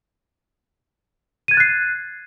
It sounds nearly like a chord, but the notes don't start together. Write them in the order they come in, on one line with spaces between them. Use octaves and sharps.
D#7 G#6 A6 F#6 C7